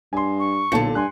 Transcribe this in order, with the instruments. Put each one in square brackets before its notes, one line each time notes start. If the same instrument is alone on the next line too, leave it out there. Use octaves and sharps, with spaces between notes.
[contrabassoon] G2 [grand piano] G#5 C6
[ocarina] C#6
[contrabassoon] B1 [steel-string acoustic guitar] A#2 D3 [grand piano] A4 A5 C#7
[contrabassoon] G2 [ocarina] G#5 [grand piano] C6 F#6